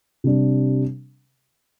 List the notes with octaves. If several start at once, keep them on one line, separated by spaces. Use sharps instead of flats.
C3 G3 D4